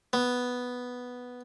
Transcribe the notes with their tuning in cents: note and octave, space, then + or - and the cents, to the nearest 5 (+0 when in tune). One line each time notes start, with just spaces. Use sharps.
B3 +0